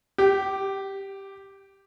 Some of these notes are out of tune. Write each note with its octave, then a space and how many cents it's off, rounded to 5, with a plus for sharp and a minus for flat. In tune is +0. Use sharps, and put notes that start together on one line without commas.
G4 +0 G5 -30